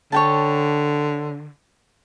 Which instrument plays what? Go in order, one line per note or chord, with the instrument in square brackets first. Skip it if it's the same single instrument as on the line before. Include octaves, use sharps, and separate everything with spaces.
[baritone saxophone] D3 [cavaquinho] C#5 G5 A5